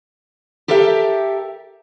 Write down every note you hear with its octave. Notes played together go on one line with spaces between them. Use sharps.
G4 A4 A#4 E5 F5 G5